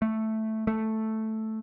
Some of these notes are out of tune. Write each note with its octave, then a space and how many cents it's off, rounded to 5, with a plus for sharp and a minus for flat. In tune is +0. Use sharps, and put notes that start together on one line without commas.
A3 +0
A3 +0